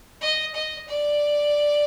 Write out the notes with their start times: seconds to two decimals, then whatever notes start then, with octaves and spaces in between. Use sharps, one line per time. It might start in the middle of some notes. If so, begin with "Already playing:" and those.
0.21 D#5
0.54 D#5
0.88 D5